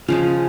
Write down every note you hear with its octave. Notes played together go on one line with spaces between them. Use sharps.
C#3 F3 G#3 C#4 F4